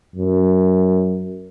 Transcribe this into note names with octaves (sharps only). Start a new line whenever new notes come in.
F#2